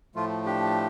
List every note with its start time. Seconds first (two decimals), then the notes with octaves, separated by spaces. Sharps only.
0.15 A2 F3 A3 F4
0.45 D4 G4